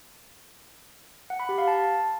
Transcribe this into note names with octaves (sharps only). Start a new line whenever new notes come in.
F#5
B5
G4
F5
A5